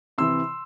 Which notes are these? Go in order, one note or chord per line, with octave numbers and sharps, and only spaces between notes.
C3 E3 C6 E6